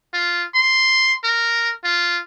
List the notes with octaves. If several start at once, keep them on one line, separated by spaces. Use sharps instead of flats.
F4
C6
A#4
F4